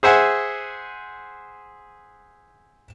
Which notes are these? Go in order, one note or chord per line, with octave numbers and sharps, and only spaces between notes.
G#4 C5 E5 F#5 G#5